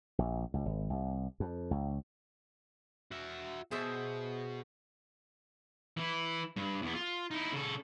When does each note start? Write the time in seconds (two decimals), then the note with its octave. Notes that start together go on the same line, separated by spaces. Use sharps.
0.19 A#1
0.54 C#2
0.66 G#1
0.90 C2
1.40 F2
1.71 C#2
3.12 F#4 E5
3.71 B2 G#4 C5 E5
5.97 E3 E4
6.56 G2
6.82 E2 B3
6.95 F4
7.31 D#4 E4
7.53 C#3 A4